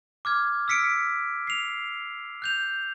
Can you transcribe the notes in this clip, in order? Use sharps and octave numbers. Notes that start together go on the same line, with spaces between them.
D6 F6 G#6
E6 F6 B6 C#7 D7
C7 F7
F#6 G6 F7